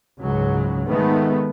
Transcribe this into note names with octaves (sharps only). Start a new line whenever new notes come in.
C#2 G#2 F#3
D#3 G#3 A3 B3